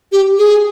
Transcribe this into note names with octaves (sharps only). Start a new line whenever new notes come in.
G4
G#4